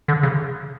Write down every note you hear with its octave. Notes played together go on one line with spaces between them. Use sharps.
D3
C#3